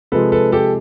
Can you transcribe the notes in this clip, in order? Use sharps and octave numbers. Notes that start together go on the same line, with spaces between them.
C3 F3 G#3 A4 B4
A4 B4
G4 A4